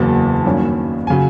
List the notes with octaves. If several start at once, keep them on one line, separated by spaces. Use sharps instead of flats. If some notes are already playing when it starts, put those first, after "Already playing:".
Already playing: F#1 E2 C#3 F#3 A#3 A5
G2 D#3 F#3 A#3 C#4
C#3 F#3 G#5